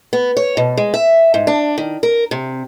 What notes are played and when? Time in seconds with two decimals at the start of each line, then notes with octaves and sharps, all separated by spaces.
0.13 B3
0.37 C#5
0.57 B2
0.77 G#3
0.94 E5
1.34 G#2
1.47 D4
1.78 D#3
2.03 A#4
2.31 C3